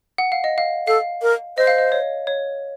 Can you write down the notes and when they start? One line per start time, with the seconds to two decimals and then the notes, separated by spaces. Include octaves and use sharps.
0.18 F#5
0.32 F5
0.44 D#5
0.58 F5
0.87 A4 F5
1.22 A#4
1.57 C5 D#5
1.67 F5
1.78 D#5
1.92 C#5
2.27 C#5